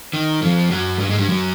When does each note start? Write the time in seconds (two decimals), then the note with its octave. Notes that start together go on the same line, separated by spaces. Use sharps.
0.13 D#3
0.42 F2 F3
0.71 F#2 F#3
0.99 G2 G3
1.10 G#2 G#3
1.19 G2 G3
1.29 F#2 F#3